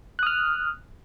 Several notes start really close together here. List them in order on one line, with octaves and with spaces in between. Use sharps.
F#6 D#6 F6